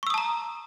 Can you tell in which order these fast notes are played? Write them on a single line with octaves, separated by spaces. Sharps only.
C#6 E6 D#6 A5 A#5